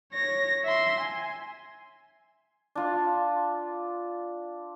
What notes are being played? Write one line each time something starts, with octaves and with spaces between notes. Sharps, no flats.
C#5 A#6
E5 C6
G#5
D4 F4